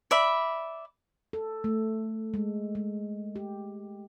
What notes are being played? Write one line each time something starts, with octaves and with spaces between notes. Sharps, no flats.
D5 E5 B5
A4
A3
G#3
G#3
G4